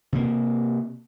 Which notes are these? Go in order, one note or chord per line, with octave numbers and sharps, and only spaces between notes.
C3 A#3